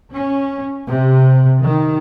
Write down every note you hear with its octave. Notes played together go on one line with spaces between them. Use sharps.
C#4
C3
D#3